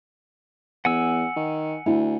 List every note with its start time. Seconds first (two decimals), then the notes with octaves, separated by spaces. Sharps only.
0.85 E2 F#5 G#5 E6
1.36 D#3
1.86 D2 E4